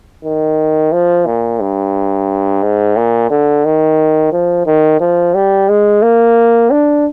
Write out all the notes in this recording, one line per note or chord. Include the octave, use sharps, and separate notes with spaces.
D#3
F3
A#2
G2
G#2
A#2
D3
D#3
F3
D#3
F3
G3
G#3
A#3
D4